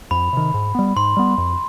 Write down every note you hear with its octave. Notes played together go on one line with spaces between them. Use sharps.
F2 B5
C3 D#3
G#2
G3 B3
G#2 C6
G3 B3
F2